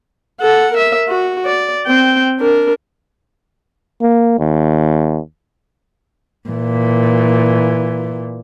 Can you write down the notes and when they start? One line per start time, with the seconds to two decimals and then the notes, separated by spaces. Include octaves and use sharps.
0.41 A4 F#5
0.73 A#4 E5
1.08 F#4
1.45 D5
1.87 C4 G5
2.39 D4 A#4
4.02 A#3
4.39 D#2
6.49 A#2 E3